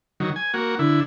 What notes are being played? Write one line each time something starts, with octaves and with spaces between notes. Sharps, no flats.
D#3 F#3
G#5
A#3 F#4
D3 E4